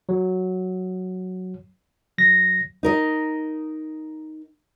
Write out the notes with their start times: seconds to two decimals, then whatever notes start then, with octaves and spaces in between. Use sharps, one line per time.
0.09 F#3
2.18 F#3 A#6
2.83 D#4 A#4 D#5